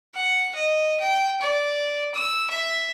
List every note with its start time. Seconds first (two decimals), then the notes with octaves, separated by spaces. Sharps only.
0.15 F#5
0.55 D#5
1.00 G5
1.41 D5
2.14 E6
2.50 E5